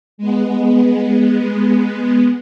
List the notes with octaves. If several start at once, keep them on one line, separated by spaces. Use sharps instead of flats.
G#3 B3